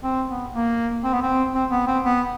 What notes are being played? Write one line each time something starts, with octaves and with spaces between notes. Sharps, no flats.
C4
B3
A#3
C4
B3
C4
C4
B3
C4
B3